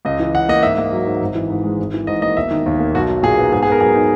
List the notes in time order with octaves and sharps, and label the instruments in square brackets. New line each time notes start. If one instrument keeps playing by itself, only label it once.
[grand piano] C#2 D#5
E3
C#3 F#5
A#3 D#5
G#2 E5
A#3
F#3
G#2
G#1
E3
G#2
G#3
G#1
E3
G#2 D#5
A#3 D#5
E1 E5
D#3
D#2
A#3
B1 F#4
F#3
A#2 G#4
B3
G#2 G#4
G#4
B3 A#4
F#3 G#4
D#4